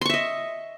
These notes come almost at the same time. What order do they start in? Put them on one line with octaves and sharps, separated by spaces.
C6 C#6 E5 D#5